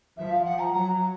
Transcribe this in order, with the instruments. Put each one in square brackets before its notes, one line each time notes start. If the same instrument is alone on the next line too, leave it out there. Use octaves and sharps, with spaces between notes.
[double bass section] F3 [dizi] E5
[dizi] F5
F#5
A#5
[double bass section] F#3 [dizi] A#5